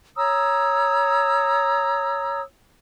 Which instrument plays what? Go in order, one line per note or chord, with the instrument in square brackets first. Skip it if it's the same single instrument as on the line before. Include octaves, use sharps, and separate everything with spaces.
[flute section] C#5 A#5 D#6 E6